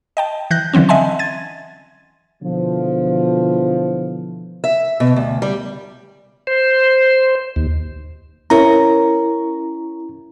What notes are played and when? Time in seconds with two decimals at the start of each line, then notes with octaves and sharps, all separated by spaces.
0.17 D#5 G5 A5
0.51 E3 F#6 G6 A#6
0.73 D3 E3 F#3 C4 C#4
0.89 D#5 E5 F#5 G#5 A5 C6
1.19 G#6 A6 D#7
2.43 B2 D3 E3 F3
4.64 E5
5.00 B2
5.16 D2
5.42 G3
6.47 C5
7.56 D#2
8.50 C#4 E4 A#4 A#5